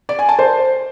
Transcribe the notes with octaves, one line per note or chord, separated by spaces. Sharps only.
D5
G#5
A5
C5